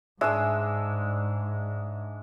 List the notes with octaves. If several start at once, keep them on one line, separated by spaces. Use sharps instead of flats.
G#2 G#3 D4 E5 E6